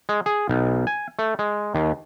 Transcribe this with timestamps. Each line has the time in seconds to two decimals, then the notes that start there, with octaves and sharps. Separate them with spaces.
0.09 G#3
0.26 G#4
0.49 B1
0.87 G#5
1.19 A3
1.39 G#3
1.75 D#2